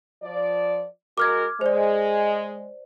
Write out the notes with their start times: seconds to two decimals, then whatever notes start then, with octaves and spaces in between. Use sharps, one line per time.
0.23 F3 D5
1.18 G#3 F#4 A#4 D6 F6 G#6
1.61 G#3 C5 D5